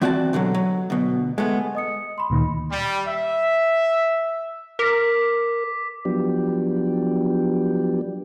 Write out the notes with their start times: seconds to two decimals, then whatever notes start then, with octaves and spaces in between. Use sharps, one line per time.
0.01 E3 C4 F#4 D5 F#5 A5
0.33 B2 D3 E3 F#3
0.54 F#3
0.90 D2 B2
1.38 G#3 A3 B3
1.75 D#5 D#6 C#7
2.18 B5 C6
2.30 D2 A#2 D#3
2.71 G3
3.07 E5
4.79 A#4 D6 B6
6.05 F3 F#3 B3 D4 G4